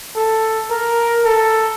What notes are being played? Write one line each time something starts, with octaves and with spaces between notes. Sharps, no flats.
A4
A#4
A4